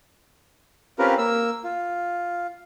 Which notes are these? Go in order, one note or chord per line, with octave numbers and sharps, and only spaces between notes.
C4 C#4 F4 G4 A#4 B4
A#3 E6
F4